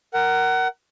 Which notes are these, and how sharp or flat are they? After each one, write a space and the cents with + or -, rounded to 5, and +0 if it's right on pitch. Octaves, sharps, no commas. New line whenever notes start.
A#4 +0 F#5 +25